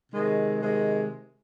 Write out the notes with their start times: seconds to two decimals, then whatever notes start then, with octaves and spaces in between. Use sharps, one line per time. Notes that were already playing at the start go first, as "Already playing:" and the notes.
0.13 C3 D#3 G#3
0.61 C3 D#3 G#3